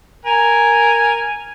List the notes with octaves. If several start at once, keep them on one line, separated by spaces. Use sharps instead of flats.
A#4 G#5